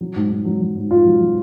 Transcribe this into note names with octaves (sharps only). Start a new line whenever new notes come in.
F#3
G#2
G#2
F#3
F#3
G#2
G#2 F4
F#3
F#3